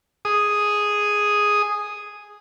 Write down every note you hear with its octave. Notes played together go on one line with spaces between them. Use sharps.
G#4 D#6